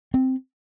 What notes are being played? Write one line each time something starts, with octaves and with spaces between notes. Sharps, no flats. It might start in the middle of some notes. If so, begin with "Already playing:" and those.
C4